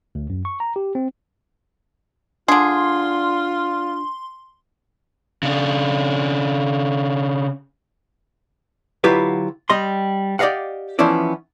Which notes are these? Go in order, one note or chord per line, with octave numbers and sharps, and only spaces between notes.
D2
F#2
C#6
A#5
G4
C4
D3 D4 F4 G#4 C6
C#3 D4
D3 F#3 E4 F4 G4 B4
G3 D#5 C6
G4 D5 D#5 F5 F#5
E3 F3 B3 C#4 E4 D5